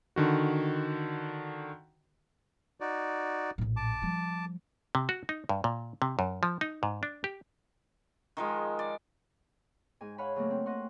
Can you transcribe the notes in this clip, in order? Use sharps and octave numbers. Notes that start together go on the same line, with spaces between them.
D3 D#3 F#4
D#4 F#4 D5
A#1 A2
A5 D6
F3 G3
C3
F#4
D#4
G2
A#2
C3
F#2
F3
D#4
G#2
D4
G4
D#3 F3 G#3
D5
G#2 G#5
C#5 F5 F#5 G#5 B5
C#3 F#3 A3 A#3
C4
D#5 F#5 C6 C#6